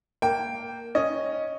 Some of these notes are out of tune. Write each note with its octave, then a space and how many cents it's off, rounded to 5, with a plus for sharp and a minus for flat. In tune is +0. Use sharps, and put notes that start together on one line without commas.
A#3 +0 G5 +0
C#4 +0 D#5 +0